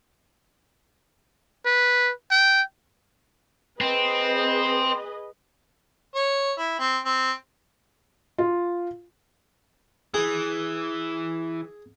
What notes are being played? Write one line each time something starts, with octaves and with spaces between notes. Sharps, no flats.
B4
G5
C4 G#4 B4 D#5
C#5
E4
C4
C4
F4
E3 G#4